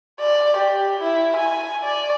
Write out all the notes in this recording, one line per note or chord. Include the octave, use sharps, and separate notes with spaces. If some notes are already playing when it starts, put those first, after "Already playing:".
D5
G4
E4
G#5
D5